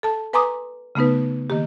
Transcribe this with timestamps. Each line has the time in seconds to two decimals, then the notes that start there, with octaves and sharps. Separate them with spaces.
0.03 A4 A5
0.33 B4 G#5 A#5 C6 D6 D#6
0.95 C#3 A3 B3 D#4 B4
1.50 D#3 A#3 G4